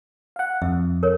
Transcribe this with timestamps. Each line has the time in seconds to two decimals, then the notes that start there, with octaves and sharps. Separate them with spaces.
0.36 F5 F#5
0.62 F2 E5
1.03 A#4 C#5